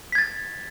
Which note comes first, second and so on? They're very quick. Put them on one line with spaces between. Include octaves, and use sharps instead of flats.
B6 G#6 A6